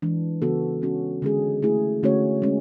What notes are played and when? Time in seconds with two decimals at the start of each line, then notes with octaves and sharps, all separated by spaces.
0.02 E3 G#3 D4
0.42 C#3 E3 B3 F#4 A4
0.82 G#3 C#4 F#4
1.22 D3 G#3 C#4 G#4
1.63 A3 E4 G#4
2.03 D3 A3 C#4 F#4 C#5
2.42 G#3 C#4